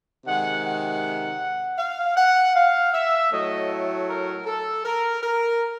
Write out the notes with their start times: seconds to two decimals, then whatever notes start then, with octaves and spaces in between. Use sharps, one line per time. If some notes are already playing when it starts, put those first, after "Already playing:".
0.25 C3 D#3 G#3 F#5
0.64 F#5
1.78 F5
2.16 F#5
2.55 F5
2.93 E5
3.31 A2 F#3 A3 D#5
4.08 A#4
4.45 A4
4.84 A#4
5.22 A#4